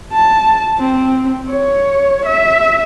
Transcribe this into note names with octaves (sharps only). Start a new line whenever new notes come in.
A5
C4
C#5
E5